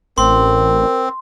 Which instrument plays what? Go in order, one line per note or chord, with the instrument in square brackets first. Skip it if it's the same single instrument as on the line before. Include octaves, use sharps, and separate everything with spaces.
[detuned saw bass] A1 [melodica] C4 [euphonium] A#4 [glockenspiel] C6